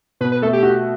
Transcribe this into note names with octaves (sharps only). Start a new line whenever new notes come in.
B2 B4
B4
A3 A4
G4
F#4